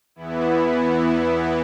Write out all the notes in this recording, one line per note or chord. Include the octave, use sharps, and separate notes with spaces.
E2 E3 B3 E4